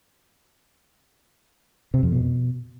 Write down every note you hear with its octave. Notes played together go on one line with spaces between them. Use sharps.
C3
F2
B2